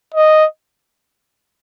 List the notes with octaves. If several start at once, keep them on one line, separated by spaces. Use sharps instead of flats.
D#5